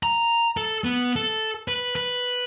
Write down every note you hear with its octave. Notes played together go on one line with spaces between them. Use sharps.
A#5
A4
B3
A4
B4
B4